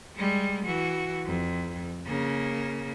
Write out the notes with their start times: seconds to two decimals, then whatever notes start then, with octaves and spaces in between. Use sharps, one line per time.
0.16 G3 G#3
0.65 E3 F#4
1.25 F2
2.07 C#3 A#3